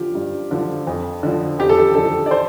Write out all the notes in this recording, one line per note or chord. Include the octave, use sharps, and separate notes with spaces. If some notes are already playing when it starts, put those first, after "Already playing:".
Already playing: D3 F3 F4 G4
G2
D3 F3
F2
D3 F3
F2 G4
A4
G4
D3 F3 A4
D5
C5